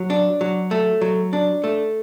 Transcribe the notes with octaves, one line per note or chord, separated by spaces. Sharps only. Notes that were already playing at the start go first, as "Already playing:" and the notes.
Already playing: F#3
D4
F#3
A3
F#3
D4
A3